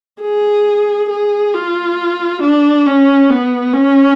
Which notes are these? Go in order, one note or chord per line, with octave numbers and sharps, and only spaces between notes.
G#4
G#4
F4
D4
C#4
B3
C#4